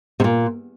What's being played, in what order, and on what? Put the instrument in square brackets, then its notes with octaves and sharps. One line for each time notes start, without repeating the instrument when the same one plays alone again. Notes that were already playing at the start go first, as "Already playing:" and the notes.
[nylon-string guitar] C3
A#2